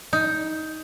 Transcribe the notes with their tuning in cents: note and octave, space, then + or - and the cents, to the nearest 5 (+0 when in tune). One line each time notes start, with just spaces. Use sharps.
D#4 +15